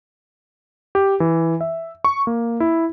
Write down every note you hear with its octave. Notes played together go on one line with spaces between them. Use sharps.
G4
E3
E5
C#6
A#3
E4